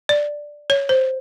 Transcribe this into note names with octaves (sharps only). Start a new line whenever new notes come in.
D5
C#5
C5